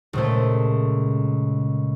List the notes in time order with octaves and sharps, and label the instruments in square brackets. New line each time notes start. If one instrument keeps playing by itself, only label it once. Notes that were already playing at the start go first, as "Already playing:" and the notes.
[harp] C#2 A#2 A3